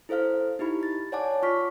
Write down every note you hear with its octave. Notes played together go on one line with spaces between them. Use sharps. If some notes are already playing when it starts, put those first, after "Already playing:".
E4 A4 C5 F5 F6
D#4 E4 G4 B5
A6
C#5 D5 F#5 G#5 A5 D6
F4 C#6 F6 B6